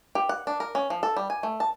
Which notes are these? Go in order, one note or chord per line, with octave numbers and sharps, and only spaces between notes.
G4
F#5
D4
A#4
C#4
F3
A4
G3
G#5
A3
A5